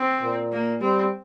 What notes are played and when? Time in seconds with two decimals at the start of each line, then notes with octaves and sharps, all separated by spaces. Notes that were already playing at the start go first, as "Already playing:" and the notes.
Already playing: C4
0.22 A#2
0.52 A#3
0.81 G3 C4